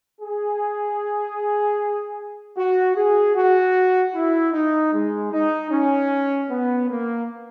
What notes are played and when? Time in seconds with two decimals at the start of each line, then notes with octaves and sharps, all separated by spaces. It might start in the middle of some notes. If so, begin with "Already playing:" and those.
0.20 G#4
2.57 F#4
2.96 G#4
3.35 F#4
4.15 E4
4.53 D#4
4.93 G#3
5.32 D#4
5.72 C#4
6.50 B3
6.90 A#3